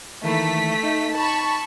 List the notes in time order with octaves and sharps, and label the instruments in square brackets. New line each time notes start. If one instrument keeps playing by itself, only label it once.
[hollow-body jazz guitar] D#3 E3 A#3 [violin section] A3 B6
[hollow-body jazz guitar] D#4
[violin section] A5 B5 C#6